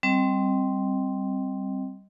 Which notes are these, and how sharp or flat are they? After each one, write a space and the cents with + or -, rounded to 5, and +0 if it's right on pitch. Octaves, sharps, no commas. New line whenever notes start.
G3 -10 C4 +0 D#5 +0